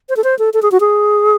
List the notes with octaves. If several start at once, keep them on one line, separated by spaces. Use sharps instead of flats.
C5
A4
C5
A4
A4
G#4
F#4
G#4